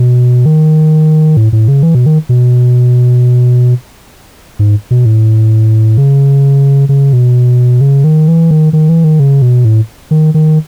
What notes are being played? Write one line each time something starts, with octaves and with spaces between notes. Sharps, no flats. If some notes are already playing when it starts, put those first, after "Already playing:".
Already playing: B2
D#3
A2
A2
C#3
E3
B2
D#3
B2
G#2
B2
A2
C#3
C#3
B2
C#3
D#3
E3
D#3
D#3
E3
D#3
C#3
B2
A2
D#3
D#3